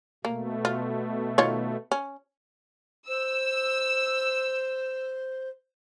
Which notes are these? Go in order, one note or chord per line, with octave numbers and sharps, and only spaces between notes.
B2 A3 A#3
F4
D#3 F4 C#5
C#4
C5 E6